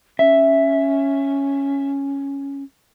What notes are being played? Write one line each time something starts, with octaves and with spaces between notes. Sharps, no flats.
C#4 E5